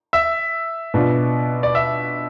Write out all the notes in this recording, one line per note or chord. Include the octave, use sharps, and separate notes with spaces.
E5
B2 B3 D4 F4
D5
E5